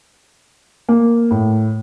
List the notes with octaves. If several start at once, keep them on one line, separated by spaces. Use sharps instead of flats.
A#3
A2